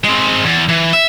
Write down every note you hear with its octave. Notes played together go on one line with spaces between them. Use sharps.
G#3 C4
E2
E3
E5